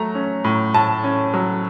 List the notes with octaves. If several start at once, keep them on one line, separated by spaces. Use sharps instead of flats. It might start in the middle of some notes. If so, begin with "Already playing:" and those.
Already playing: F#3 A3 A#5
C#4
A2
A2 A5
C#4
F#3